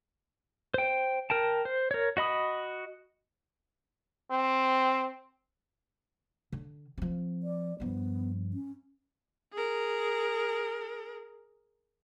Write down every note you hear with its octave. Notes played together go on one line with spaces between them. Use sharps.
C5 G5
A#4 G5 A5
C5
A#4 C#5
F#4 D#5 B5 D#6
C4
D3
F3 C4
D5
G2 F3 B3
C#4
G#4 A#4